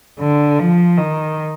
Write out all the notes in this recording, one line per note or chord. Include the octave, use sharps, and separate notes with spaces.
D3
F3
D#3